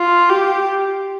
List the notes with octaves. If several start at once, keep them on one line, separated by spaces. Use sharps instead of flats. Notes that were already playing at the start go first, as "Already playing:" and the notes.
Already playing: F4
G4